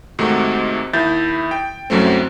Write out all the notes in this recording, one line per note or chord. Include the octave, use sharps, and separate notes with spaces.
G#2 C3 D#3 A3 F#4
D#2 E4 G6 A6
G5
C2 F#2 F#3 A3 C4